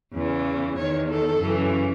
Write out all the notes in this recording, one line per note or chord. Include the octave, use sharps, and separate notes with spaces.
E2 C#3 E3
E2 D#3 C#5
A4
F#2 C#3 E3